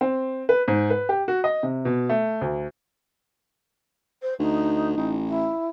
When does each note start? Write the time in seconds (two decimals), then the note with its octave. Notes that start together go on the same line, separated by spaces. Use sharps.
0.01 C4
0.49 B4
0.68 G#2
0.90 B4
1.09 G4
1.28 F#4
1.44 D#5
1.63 C3
1.85 B2
2.09 A3
2.41 D2
4.22 C5
4.39 D2 D#4
4.97 A1
5.27 E4